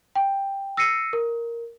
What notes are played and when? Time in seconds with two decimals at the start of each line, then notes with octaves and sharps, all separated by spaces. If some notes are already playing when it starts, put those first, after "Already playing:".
0.15 G5
0.77 E6 A#6 C7 C#7 D#7
1.13 A#4